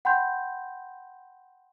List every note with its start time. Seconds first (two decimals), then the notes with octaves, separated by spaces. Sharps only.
0.05 F#5 G5 B5 C6 G6